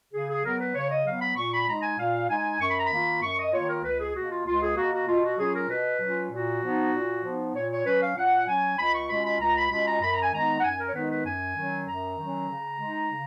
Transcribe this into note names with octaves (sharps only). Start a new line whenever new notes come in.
C#3 G#4
G#4
F#3 B3 A#4
B4
C#3 C#5
D#5
F#3 B3 F5
B5
A#2 C#6
B5
G#3 D#4 A#5
G#5
A#2 F5
G#3 D#4 G#5
F#2 C#6
B5
A#5
B5
D#3 A#3 F4
F#2 C#6
D#5
D#3 A#3 F4 C#5
A#4
C#2 B4
G#4
B2 A#3 F#4
F4
C#2 F4
G#4
B2 A#3 F#4
F#4
B2 F4
F#4
F#3 C#4 F4 G#4
A#4
B2 B4
F#3 C#4 F4
A#2 F#4
F3 B3 D#4
A#2
F3 B3 D#4
A#2 C#5
C#5
F#3 C#4 B4
F5
A#2 F#5
F#3 C#4 G#5
C#2 B5
C#6
B2 G#3 C#4 F4 B5
B5
C#2 A#5
B5
B2 G#3 C#4 F4 B5
A#5
F#2 B5
A#5
G#5
D#3 G#3 B3 D#4 A#5
F#5
F#2 G#5
A#4
C#5
D#3 G#3 B3 D#4 B4
B4
F#2 G#5
D#3 F#3 C#4
F#2 A#5
D#3 F#3 C#4
C#3
G#3 D#4
C#3